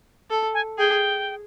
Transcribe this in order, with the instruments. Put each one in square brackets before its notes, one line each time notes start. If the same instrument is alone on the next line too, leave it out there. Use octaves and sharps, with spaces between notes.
[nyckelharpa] A4
[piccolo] G#5
[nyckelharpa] G#4 [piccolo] G5